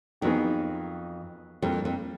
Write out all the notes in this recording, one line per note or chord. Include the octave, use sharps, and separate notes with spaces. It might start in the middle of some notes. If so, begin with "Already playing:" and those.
F2 D#3 F#3 B3 D#4 G#4
F2 G3 A#3 D4
F2